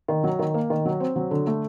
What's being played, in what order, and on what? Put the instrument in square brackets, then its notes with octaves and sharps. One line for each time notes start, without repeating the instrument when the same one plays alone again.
[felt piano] D#3
F#3
D#3
A#3
D#3
F#3
C4
F#3
D3
A3